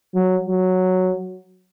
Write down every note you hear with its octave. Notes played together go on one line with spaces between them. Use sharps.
F#3
F#3